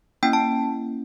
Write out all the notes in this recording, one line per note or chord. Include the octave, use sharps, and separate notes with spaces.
A#3 C#4 E4 G5
A5